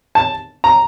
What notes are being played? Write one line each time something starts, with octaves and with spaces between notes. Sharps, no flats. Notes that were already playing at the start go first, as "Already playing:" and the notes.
A5
A#5